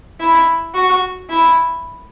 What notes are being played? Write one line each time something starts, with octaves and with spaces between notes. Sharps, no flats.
E4
F#4
E4